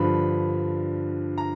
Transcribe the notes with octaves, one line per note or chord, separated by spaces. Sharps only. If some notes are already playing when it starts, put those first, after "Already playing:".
Already playing: G2 D3 F3 B5
A#5